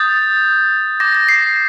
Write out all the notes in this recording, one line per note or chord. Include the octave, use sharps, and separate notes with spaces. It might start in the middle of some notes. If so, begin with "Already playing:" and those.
Already playing: D#6 G6 A6
D6 G6 A#6
A#6
C7